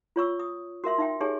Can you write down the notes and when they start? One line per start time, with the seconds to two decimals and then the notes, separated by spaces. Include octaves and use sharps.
0.16 F4 C#5 C#6 E6
0.39 D#6
0.84 F#4 A#4 E5 C6
0.98 D#4 E5 G5
1.20 D#4 G4 G#4 C#5 G#5